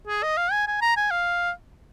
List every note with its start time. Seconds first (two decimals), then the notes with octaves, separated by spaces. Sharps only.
0.08 G#4
0.23 D#5
0.37 F5
0.52 G#5
0.67 G#5
0.81 A#5
0.97 G#5
1.11 F5